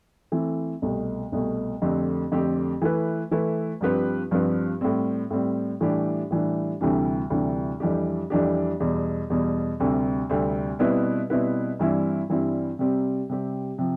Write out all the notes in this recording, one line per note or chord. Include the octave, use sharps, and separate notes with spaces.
E3 A3 C4
C2 B2 A3
C2 B2 A3
F2 D3 A3 C4 G4
F2 D3 A3 C4 G4
E3 A3 E4 B4
E3 A3 E4 B4
G2 F3 C4 G4 B4
G2 F3 C4 G4 B4
A2 G3 C4
A2 G3 C4
A2 E3 G3 D4 G4
A2 E3 G3 D4 G4
D2 C3 E3 G3 D4
D2 C3 E3 G3 D4
F2 E3 G3 D4 G4
F2 E3 G3 D4 G4
E2 B2 G3
E2 B2 G3
D2 C3 G3 C4
D2 C3 G3 C4
B2 G3 C4 E4 B4
B2 G3 C4 E4 B4
G2 E3 G3 C4 E4
G2 E3 G3 C4 E4
C3 G3 C4 G4
C3 G3 C4 G4
C3 F3